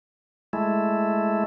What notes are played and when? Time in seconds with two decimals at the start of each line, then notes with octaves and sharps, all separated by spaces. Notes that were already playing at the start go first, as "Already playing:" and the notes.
0.53 G#3 A3 E4